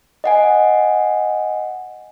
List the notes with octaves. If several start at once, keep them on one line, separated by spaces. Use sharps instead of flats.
D#5 F#5 G#5